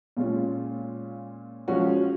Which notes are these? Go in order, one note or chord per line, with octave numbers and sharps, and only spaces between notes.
A#2 G#3 C#4 F4
F3 G#3 C#4 F#4